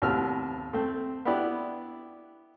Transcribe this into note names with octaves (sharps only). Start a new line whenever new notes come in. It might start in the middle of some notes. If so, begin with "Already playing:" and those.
D#2 A2 C3 B3 E6 F6
A3 C4
B3 D4 E4 G4 D5